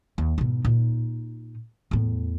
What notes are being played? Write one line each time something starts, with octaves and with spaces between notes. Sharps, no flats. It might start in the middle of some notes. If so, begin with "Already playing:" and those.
D#2
G#2 B2
A#2 D#4
E2 A2